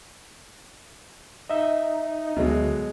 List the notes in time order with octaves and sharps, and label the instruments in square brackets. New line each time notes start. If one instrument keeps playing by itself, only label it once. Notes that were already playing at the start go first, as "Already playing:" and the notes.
[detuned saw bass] D#4 [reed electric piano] D#5 E5
[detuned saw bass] D2 [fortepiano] B2 F#3 G#3